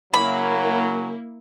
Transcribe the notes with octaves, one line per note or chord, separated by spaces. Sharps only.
C#3 F#3 A#3 E4 B5